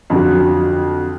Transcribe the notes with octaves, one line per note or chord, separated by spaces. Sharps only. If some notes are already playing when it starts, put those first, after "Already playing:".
F2 D3 F#3